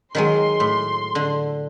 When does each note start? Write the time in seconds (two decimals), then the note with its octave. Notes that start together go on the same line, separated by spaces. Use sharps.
0.15 D#3 F#3 G#3 C6
0.60 A2
1.15 D3